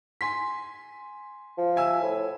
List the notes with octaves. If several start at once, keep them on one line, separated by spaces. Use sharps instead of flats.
G#5 C6 B6
F3
E5 G#5 E6
A2